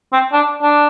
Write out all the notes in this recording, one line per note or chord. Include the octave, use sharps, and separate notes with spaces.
C4
D4
D4